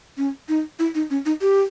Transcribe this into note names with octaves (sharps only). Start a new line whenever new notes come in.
C#4
D#4
E4
D#4
C#4
D#4
G4